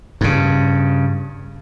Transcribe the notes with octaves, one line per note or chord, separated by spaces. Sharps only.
G2 C#3